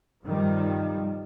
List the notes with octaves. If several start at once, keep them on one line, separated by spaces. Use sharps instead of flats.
G2 C3 D#3 F3 G3